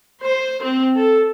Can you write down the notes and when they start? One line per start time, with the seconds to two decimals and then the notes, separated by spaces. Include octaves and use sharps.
0.23 C5
0.63 C4
0.96 A4